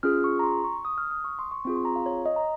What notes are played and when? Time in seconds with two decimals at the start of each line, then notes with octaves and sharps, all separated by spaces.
0.03 C#4 F4 G#4 F6
0.24 C#6
0.39 A#5
0.43 C6
0.64 C#6
0.85 D#6
0.98 F6
1.11 D#6
1.24 C#6
1.39 C6
1.51 C#6
1.65 C4 F4 G#4 C#6
1.76 C6
1.85 A#5
1.96 F5
2.06 C#5
2.26 D#5
2.36 A#5